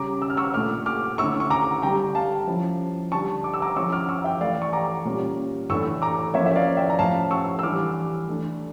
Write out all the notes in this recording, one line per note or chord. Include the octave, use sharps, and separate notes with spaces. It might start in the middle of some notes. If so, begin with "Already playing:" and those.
Already playing: C#3 G3 C#4 A#5 D6
E6
F6
C#6 E6
A#2 A3 D4 D6 F6
D6 F6
D3 A3 C#4 E4 C#6 E6
C#6
A#5 D6
D3 G3 D4 G5 A#5
F5 A5
F3 C#4 E4
D3 G3 D4 A5 C#6
D6
E6
A#5 D6
F3 C#4 E4 C#6 E6
D6 F6
C#6 E6
E5 G5
E3 A3 E4 D5 F5
C#6
A#5 D6
A#2 G3 C#4
A2 E3 A3 D4 C#6 E6
A#5 D6
F3 A#3 C#4 E4 C#5 E5
E5
D5 F5
E5 G5
A#5
A2 F3 C#4 F5 A5
C#6 E6
E6
E3 G3 D4 D6 F6
E3 A3 D4